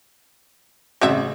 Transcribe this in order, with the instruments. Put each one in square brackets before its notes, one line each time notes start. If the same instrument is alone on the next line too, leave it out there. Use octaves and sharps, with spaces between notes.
[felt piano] A1 C#3 [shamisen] C4 F#4 E5